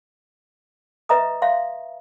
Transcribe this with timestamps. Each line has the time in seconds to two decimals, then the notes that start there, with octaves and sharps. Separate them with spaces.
1.09 B4 D#5 E5 A#5 D#6
1.42 E5 F5 C6